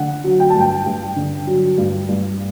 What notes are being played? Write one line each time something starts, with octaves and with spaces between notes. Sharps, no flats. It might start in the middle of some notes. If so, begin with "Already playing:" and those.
Already playing: D3 F#5
F#3
G5
G2 A5
G5
G2
D3
F#3
G2
G2